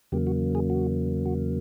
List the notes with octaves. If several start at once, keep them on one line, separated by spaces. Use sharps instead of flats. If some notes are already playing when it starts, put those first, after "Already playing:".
E2 C#3 F#3 A#3 G4
F#4
G#4
F#4
F#4